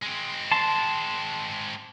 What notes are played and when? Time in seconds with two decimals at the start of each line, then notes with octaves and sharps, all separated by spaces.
0.03 G#3 C4
0.52 A5 C6